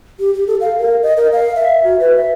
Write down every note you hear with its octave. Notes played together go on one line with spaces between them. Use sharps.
G4
G4
A4
F5
A#4
D#5
A#4
F5
E5
F#4
B4
E5